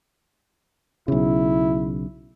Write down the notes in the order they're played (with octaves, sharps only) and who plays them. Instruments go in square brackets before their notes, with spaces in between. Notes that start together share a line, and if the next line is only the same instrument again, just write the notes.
[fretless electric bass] B1 C#3 [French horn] E4